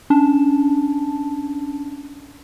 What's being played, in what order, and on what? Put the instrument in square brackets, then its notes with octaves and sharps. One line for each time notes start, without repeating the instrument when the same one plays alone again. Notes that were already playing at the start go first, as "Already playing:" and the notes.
[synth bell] C#4 D4 A5